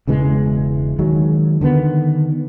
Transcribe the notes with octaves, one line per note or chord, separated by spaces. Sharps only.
E1 C#3 E3 G#3
D#3 F#3 G#3
D3 D#3 B3